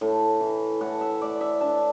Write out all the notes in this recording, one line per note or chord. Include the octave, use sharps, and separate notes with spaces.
A2
E3
A2 F#5
E5
A3 D5
E5
D4 A5